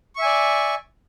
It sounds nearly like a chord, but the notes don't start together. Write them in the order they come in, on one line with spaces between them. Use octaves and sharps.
C#6 E5 G#5 D5